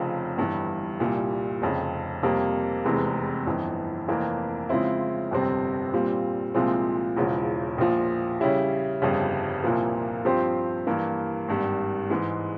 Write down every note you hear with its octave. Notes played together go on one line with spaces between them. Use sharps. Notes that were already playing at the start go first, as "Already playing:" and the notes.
Already playing: F1 F2 C#3 F3
G1 G2 E3
C2 A#2 G3
F1 F2 C#3
F2 C3 G3 A#3
F1 E2 C3 E3 G#3
G1 F2 E3
F1 F2 E3 A#3
C#3 F3 G#3 C4 E4
G1 F2 C3 G3 C4
A#2 G3 C4 F4
C2 A#2 F3 G#3 C4
E1 E2 C#3 F3
A#1 A#2 F3
C#3 G3 C#4 E4 G4
G1 F2 C#3 G3
C2 A#2 F3 A#3
G2 F3 C4 G4 C5
G2 E3 A#3
G#1 G2 G3
G#2 E3 G#3